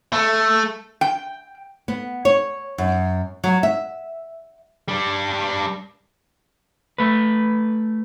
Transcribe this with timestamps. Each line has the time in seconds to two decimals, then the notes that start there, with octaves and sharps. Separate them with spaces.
0.13 A3
1.01 G5
1.88 B3
2.25 C#5
2.78 F#2
3.44 F#3
3.63 E5
4.88 G3 D4
6.98 A3 B4